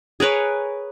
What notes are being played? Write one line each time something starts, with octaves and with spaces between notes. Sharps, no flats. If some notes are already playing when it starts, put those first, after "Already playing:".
G#4 A#4 B4 C#5